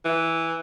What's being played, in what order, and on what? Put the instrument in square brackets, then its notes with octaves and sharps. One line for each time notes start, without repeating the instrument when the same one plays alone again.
[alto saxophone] E3